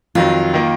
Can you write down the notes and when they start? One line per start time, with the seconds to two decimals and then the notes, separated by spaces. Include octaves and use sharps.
0.15 F2 D#3 F#3 F4
0.54 D#3 A#3